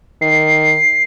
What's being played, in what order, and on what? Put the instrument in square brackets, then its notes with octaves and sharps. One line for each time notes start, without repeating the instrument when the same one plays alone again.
[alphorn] D#3 [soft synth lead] C7